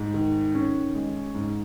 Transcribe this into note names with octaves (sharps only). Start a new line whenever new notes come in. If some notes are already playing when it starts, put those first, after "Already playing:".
Already playing: G#2
D#3
C#4
G#3
G#2